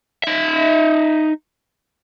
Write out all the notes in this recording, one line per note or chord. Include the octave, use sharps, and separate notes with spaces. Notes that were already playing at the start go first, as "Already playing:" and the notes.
D#4 E5